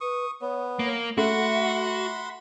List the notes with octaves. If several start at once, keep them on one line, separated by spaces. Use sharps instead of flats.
B4 C#6 D#6
B3 C#5
A#3
A3 F#4 E5 F#5 B5 C6